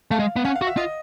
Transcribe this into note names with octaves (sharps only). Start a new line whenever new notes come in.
A3 F5
G#3
B3
C#4 F#5
F5
F#4
E5
F4 D#5